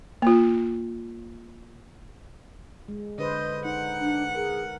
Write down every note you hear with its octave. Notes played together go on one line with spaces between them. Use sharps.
A#3 F4
G#3
D3 B4 C5 D#5
D#4 F#5
D4
G#4 A#4